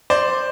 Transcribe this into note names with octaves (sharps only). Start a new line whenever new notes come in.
C5 D5